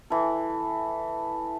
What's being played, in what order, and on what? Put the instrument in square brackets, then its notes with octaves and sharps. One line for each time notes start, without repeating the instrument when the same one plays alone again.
[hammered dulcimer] E3 A4